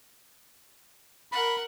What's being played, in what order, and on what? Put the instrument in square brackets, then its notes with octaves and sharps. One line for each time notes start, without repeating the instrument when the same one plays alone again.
[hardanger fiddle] A#4 F#5 [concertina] B5